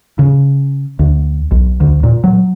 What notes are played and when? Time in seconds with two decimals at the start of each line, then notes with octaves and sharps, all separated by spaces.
0.19 C#3
0.99 D2
1.51 B1
1.80 D2
2.04 A#2
2.24 F#3